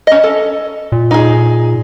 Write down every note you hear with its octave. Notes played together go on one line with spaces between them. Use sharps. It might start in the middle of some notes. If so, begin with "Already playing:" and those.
C#4 D#5
A4
A#2
D#4 G#4